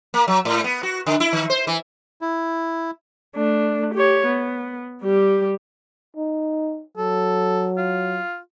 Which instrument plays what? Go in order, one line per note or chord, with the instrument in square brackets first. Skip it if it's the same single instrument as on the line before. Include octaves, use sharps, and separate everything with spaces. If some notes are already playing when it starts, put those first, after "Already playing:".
[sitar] A#3
F#3
A2
B3
F#4
D3
E4
D#3
C5
E3
[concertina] E4
[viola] A3 D4
G4 C#5
B3
G3 G4
[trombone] D#4
[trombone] F#3 [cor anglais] A4
[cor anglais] F4